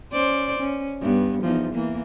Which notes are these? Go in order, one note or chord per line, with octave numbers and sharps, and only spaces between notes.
C#4 C5 D5
C#4
G2 B3
E2 F3 D#4
E3 A#3